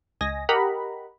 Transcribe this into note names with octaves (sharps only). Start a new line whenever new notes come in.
C#2 D#5 G#5 A#6
G4 A#4 D#5 F#5 A#5 B5